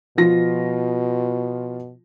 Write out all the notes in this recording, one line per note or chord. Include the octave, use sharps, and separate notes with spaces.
B2 F3 F4 A#6